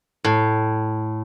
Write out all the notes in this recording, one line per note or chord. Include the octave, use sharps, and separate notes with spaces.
A2